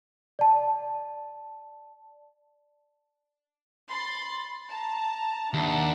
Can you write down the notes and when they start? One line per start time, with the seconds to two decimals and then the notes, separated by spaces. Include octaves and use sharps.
0.39 D5 A5
3.89 B5 C6 A6
4.69 A5 A#5
5.54 D#2 D4 E5 F#5